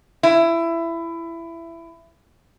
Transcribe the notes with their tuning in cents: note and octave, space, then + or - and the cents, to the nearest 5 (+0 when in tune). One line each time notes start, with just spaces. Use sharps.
E4 +20